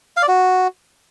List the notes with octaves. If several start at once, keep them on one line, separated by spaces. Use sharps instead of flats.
F5
D5
F#4